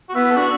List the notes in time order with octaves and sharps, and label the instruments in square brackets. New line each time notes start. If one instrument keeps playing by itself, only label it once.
[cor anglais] F#4
[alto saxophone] B3 [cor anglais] E4
[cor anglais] A4
[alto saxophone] D4 [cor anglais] F#4